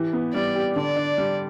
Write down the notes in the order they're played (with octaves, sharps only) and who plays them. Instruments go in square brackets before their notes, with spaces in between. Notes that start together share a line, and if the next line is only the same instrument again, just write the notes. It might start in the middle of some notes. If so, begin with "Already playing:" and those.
Already playing: [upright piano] E3 G4
B3
[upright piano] G3 [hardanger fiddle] D5
[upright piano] G4
[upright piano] D3 [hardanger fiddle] D5
[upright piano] D4
G3